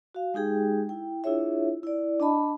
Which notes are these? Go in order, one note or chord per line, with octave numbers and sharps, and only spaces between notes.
F#4 F5
G#3 D#4 G4 G#4 G5
E4 G5
D4 E4 F4 G#4 C#5 E5
E4 D5
D4 D#5 A5 B5